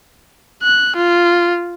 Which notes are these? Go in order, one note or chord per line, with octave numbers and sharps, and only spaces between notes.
F#6
F4